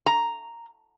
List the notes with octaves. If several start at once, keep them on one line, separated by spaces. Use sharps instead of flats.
A#5